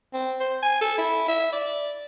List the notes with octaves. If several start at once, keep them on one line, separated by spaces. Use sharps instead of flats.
C4
C5
G#5
A4
E4
E5
D5